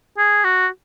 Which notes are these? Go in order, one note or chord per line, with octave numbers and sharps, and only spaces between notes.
G#4
F#4